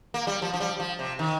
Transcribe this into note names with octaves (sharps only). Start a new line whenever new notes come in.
A#3
G3
F3
F3
G3
F3
C3
D#3